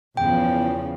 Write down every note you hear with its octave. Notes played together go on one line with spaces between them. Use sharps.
E2 C#3 F3 G5